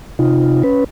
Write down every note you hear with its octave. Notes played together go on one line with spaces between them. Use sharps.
C3 D#4 F4
C#4 B4